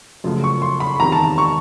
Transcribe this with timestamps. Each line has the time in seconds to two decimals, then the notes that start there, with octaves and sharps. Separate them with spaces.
0.24 F#2 C#3 F3 A3
0.44 C#6
0.62 C6
0.80 B5
1.00 E2 C3 D#3 A#5
1.12 A5
1.24 A#5
1.38 C#6